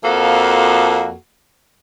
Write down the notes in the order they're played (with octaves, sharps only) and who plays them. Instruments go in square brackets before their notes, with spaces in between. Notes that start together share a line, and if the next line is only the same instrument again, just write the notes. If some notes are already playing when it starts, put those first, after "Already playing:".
[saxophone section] F2 F3 A#3 F#4 A4